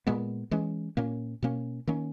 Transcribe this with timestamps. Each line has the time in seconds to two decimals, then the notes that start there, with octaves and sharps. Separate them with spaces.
0.07 A#2 G#3 B3
0.51 E3 G#3 C#4
0.97 A#2 A#3 C#4
1.42 B2 A#3 C#4
1.87 D#3 A#3 C#4